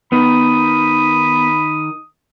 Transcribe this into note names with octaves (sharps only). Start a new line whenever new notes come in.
D#3 B3 D#4 B5 D#6